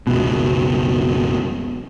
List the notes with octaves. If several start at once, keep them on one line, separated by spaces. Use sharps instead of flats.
F#1 C#2 B2